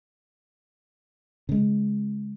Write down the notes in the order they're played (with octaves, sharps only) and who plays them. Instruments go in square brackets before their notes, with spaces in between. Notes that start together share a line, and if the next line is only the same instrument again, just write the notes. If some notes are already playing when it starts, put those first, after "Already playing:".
[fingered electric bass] C#3 G#3